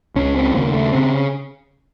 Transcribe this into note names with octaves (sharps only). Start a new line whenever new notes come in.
C#2 C#3 C#4
C4
D#2 C#3 A#3
A3
C#3 C4